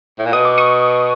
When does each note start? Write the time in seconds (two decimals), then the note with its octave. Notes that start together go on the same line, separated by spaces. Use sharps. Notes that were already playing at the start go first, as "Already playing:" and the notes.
0.18 A2
0.25 A#2
0.33 B2 D#6
0.45 D6
0.58 C#6 D#6